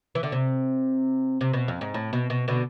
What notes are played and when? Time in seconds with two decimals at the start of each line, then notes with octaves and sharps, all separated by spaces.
0.15 E3
0.23 D3
0.32 C3
1.41 C3
1.53 B2
1.68 F2
1.81 G#2
1.94 A2
2.13 B2
2.30 B2
2.48 B2 D3